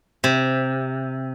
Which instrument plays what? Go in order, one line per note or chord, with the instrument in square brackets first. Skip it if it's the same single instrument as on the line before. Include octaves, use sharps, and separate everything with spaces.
[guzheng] C3